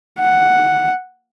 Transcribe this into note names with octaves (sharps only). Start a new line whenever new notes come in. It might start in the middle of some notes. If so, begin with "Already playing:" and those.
F#5